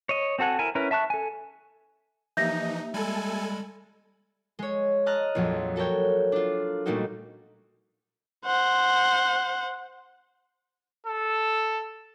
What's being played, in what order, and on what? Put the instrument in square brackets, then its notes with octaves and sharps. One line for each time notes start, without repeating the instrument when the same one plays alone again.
[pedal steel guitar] C#5 D#5
C4 F#4 A4 F#5 G#5
E4 A#4 G#5
C#4 E4 A#4 B4
E5 A5 C#6 F#6
A4 G#5
[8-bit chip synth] E3 F3 [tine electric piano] A#3 G4 E5 [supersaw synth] D#4 [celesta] G6 A#6
[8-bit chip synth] G3 G#3 B5 [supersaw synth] A4 G#5
[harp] G#3 C#5
D#5 A5 A#5 D#6 F6 F#6
A#1 F2 F#3
F#4 A4 A#4 C#5 G5
D4 F4
A#2 G3 A3 A#3 D#4 F#4
[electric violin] C5 F#5
[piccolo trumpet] A4